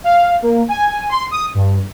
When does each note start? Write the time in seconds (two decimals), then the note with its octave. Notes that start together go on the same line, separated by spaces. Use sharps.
0.04 F5
0.42 A#3
0.69 G#5
1.09 C6
1.31 D#6
1.55 G2